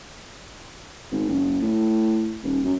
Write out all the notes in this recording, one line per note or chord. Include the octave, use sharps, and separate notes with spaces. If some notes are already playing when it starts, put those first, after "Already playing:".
G#1
F#1
A2
D#1
F#2